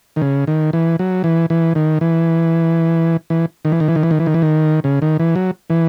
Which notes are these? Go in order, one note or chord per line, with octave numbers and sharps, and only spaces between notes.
D#3
C#3
D#3
E3
F#3
E3
E3
D#3
E3
E3
D#3
E3
D#3
E3
D#3
E3
D#3
E3
D#3
E3
D#3
C#3
D#3
E3
F#3
E3